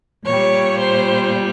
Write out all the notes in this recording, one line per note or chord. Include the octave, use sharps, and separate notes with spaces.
A#2 G3 C#5
C5